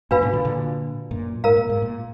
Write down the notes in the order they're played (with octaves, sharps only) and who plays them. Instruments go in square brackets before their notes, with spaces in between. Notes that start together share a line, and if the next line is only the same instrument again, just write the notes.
[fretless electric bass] F#2 A#2 [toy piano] D4 F#4 B4 F5 B5
[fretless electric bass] G#2 B2
A#2 D3
A#2 D3
F#2 A#2
[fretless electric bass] G#2 [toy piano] A#4 F5 A#5
[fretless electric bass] A#2
G#2
A#2